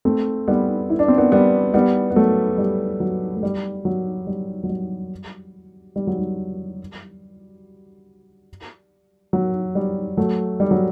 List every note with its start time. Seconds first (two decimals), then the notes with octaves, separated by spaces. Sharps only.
0.05 A3 C4
0.48 G3 B3
0.90 E4
0.99 D4
1.08 C4
1.17 B3 D4
1.32 G3 B3
1.74 G3 B3
2.11 B3
2.16 F#3 A3
2.58 G3
3.00 F#3
3.36 A3
3.43 G3
3.85 F#3
4.27 G3
4.63 F#3
4.69 G3
5.96 G3
6.07 F#3
6.19 G3
9.33 F#3
9.75 G3
10.17 F#3 A3
10.60 G3
10.71 F#3